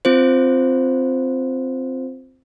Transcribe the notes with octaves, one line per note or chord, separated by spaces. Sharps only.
C4 F4 C5